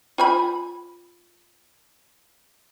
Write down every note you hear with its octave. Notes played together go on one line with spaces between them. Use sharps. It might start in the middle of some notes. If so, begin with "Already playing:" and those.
F4 G#5 B5